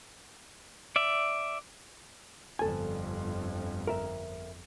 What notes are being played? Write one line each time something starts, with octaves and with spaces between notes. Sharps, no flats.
D5 E5
G1 F2 A4 G#5
A#4 E5